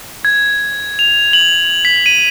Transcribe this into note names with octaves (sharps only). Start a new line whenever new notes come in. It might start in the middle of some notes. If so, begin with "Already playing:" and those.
G#6
F7
F#7
B6
D#7